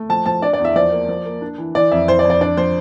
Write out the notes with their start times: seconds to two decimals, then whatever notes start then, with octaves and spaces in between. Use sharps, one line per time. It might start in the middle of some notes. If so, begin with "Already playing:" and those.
Already playing: A3
0.09 F3 A5
0.26 F3 A5
0.42 D4 D5
0.53 D5
0.59 E2
0.65 E5
0.76 F3 D5
0.92 A#3
1.09 F3
1.25 A#3
1.42 D4
1.58 E3
1.75 E3 D5
1.91 F2 E5
2.08 E3 C5
2.19 D5
2.25 F2
2.30 D5
2.41 D4 D5
2.57 F3 C5